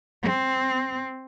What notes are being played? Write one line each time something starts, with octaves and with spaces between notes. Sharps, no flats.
C4